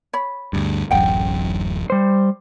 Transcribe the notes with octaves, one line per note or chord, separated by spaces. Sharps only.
C#5 B5
D2 G2
D1 A1 F#2 F#5 G5
G3 C5